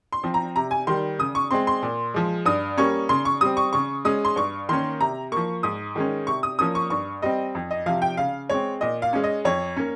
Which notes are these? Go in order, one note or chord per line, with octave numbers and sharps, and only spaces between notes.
C6
F3 C4
A#5
C3 A#5
G#5
D#3 G3 C6
C#3 D#6
C#6
G#3 C4 C6
C6
A#2
F3 G#3
G2 D#6
G3 A#3 C#4 C#6
C#3 C6
C#6
G3 C4 D#6
C#6
C#3 C#6
G#3 C#4 D#6
C6
G2 C#6
D#3 A#3 C#4 C6
C3 A#5
F3 A#3 C#6
G#2 D#6
D#3 G#3 C#4
C3 C#6
D#6
F3 A#3 C#4 D#6
C#6
G2 C#6
G3 C4 D#5
F2
D#5
C3 F3 F5
G5
C#3 F5
G#3 C4 C#5
A#2 D#5
F5
G#3 C#4
D#5
F2 C#5
A#3 C#4